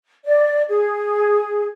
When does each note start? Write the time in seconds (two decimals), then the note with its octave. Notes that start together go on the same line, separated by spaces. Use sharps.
0.25 D5
0.69 G#4